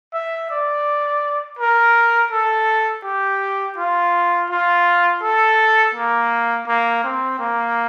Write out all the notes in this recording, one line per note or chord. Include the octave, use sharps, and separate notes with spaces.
E5
D5
A#4
A4
G4
F4
F4
A4
A#3
A#3
C4
A#3